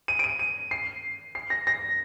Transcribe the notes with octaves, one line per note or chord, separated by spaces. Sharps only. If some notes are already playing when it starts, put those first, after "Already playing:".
D#7
D7
D#7
D#7
C7
C7
A#6
A#6